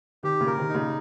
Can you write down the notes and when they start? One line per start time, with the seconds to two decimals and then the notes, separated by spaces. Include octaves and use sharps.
0.23 C3 D#3 G4
0.41 A#2 C#3
0.47 A#4
0.58 C3 D#3
0.69 D#4
0.74 A#2 C#3